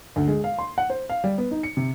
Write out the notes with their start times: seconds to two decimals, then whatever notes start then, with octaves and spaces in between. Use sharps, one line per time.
0.16 D2
0.28 G#3
0.44 F5
0.59 C6
0.78 F#5
0.90 C5
1.09 F5
1.24 G3
1.38 B3
1.51 D#4
1.63 C#7
1.77 C3